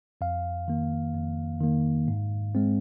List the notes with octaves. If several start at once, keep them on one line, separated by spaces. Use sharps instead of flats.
F2 F5
D#3 A#3
F2
D#3 A#3
G#2
G#3 C4